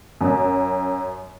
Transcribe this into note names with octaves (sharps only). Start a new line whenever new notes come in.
F#2